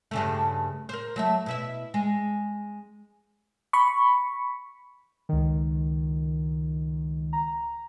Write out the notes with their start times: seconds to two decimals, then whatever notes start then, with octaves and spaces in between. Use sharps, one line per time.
0.11 G2 C#3 A3
0.89 A#4 C5
1.16 F#3 A3 E5
1.46 B2 E4 E5
1.94 G#3
3.73 B5 C#6
5.29 C#2 D#3
7.33 A#5